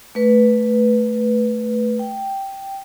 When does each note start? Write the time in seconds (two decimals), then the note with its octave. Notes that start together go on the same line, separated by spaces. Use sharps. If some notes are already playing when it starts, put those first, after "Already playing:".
0.15 A3 B4
1.99 G5